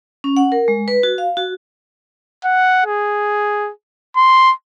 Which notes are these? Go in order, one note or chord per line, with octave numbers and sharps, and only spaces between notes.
C#4
F#5
A#4
G#3
B4
F#4
F5
F#4
F#5
G#4
C6